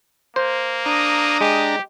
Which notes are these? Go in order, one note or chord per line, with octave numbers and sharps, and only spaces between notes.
A#3 C5
D4 A#5 D#6
G#3 G4